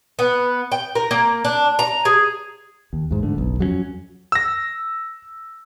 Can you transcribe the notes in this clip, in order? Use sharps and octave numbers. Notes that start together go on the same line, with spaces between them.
B3
G5
A#4
A#3
D4
A#5
G#4
D#2
E2 G#2
G#2 D3 A3
F#1 B1
F2 F#3 A#3 C#4
E6 A#6